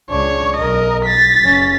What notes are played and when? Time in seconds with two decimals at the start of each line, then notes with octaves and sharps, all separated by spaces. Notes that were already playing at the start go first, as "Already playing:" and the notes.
0.10 C#2 D4 C#5
0.57 B1 A#4 D#5
1.05 A6 B6
1.41 F#1 C#4